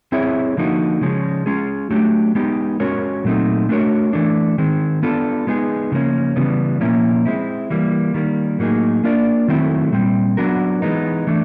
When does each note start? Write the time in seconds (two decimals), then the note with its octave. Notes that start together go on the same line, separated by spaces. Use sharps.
0.12 C4 E4 G#4 C#5 E5
0.57 D3 F3 A#3 D#4 F#4
1.01 C#3 F3 G#3 C#4
1.46 G#3 C#4 F4 G#4
1.90 F#3 A3 D4 G4
2.35 G#3 B3 D#4 G4
2.80 G#3 C#4 F#4 A#4 C#5
3.24 A#2 F#3 A3 C4 D#4
3.69 A3 D4 F#4 A#4 C#5
4.13 E3 A3 D4
4.58 D#3 G#3 C4
5.03 B3 D4 F4 A4
5.47 G#3 B3 D#4 G#4
5.92 C#3 F3 A#3 C#4
6.36 C#3 E3 G3 B3
6.81 A#2 F3 A#3 C#4 E4
7.25 G#3 C4 E4
7.70 E3 G3 A#3
8.14 D#3 G3 A#3
8.59 A2 F#3 A#3 D#4 G#4
9.04 A#3 D4 F4 A#4 D5
9.48 D#3 F#3 A3 C4 E4
9.93 A#2 G3 C4
10.37 F#3 B3 D4 F#4 A#4
10.82 E3 G#3 B3 D#4
11.27 E3 A3 D4